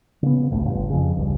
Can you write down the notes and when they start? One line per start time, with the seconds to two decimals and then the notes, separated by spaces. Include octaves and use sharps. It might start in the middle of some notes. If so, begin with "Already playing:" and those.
0.23 C#3 B3
0.51 E1 A1 D2 A2
0.66 G1
0.90 F2 C#3
1.15 F1 C#2 G2